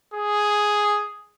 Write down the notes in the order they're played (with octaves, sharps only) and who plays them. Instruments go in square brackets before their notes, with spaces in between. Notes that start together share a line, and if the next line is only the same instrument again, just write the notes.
[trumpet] G#4